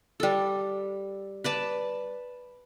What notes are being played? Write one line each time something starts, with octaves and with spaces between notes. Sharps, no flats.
G3 A4
B4 D5 A5